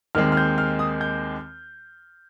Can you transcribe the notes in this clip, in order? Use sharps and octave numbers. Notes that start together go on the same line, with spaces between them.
D#2 D#3 G#3 C4 F6
F6
G6
F6
D#6
G6